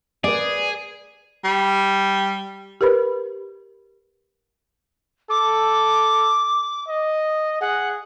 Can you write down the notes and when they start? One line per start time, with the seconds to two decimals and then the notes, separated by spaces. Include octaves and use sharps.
0.24 G#4 B4 D5
1.44 G3
2.81 G4 A#4 B4 B5
5.30 A4 D6
6.89 D#5
7.61 G#4 F#5